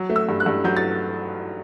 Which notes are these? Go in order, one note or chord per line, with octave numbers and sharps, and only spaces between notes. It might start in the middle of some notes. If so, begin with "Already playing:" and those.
Already playing: F#3
A3
E6
G2
F#6
G2
F#3 G6
A6